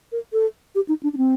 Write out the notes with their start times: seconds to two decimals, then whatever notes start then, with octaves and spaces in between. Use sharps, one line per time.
0.12 A#4
0.33 A4
0.75 G4
0.89 D#4
1.03 D4
1.13 D4
1.17 C4